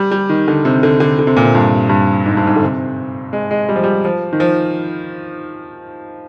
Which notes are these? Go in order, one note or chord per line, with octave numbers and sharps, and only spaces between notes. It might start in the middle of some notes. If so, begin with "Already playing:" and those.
Already playing: G3
G3
D#3
D3
C3
D3
D3
D3
C3
A#2
C3
G2
G2
G#2
G2
G#2
D3
C3
G#3
G#3
G3
F3
G3
F3
D#3
F3